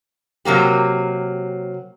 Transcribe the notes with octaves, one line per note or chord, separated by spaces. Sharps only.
C3 F#3 A#3 G4